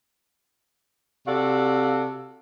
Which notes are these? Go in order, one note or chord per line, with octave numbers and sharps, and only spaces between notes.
C3 F#4 A4 D5 F5